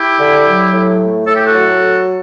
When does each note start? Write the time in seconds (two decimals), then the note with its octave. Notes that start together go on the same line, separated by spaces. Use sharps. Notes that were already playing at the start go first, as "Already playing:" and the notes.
Already playing: E4 G4
0.19 D3
0.45 F#3
0.73 A2
1.00 A3
1.26 A2 A4
1.36 G4
1.46 F#4 A4
1.54 F#3